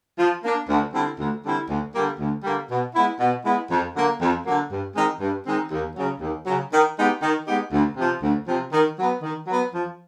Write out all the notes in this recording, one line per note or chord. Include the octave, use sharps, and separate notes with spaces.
F3
A#3 D4
D2
D3 G3 C4 E4
D2
D3 G3 C4 E4
D2
D3 G3 A#3
D2
D3 G3 A#3
B2
G#3 B3 E4
B2
G#3 B3 E4
F2
D3 F#3 A#3
F2
D3 F#3 A#3
G2
D#3 G#3 C4 D#4
G2
D#3 G#3 C4 D#4
D#2
C#3 F#3
D#2
C#3 F#3
D#3
G#3 B3 D#4 G4
D#3
G#3 B3 D#4 G4
D2
C3 F3
D2
C3 F3
D#3
F#3 B3
D#3
F#3 B3
F3